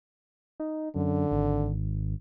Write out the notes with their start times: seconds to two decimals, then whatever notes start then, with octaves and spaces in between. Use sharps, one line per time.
0.60 D#4
0.95 F#2 D3
1.31 G#1